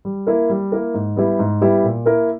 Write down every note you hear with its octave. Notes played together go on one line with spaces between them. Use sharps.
G3
A#3 E4 A#4
G3
A#3 E4 A#4
G#2
G3 B3 E4 G4
G#2
G3 B3 E4 G4
A#2
A#3 E4 A#4